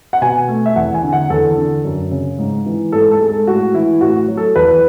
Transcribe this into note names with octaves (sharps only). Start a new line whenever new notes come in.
F#5
B2 G#5
A3
E5
E2 F#5
G#5
D3
F#5
E2 A4
D3
F#2
C#3
G#2
E3
G#2 A4
A4
G#3
A4
A2 F#4
E3 E4
A2 F#4
F#3
A4
E2 B4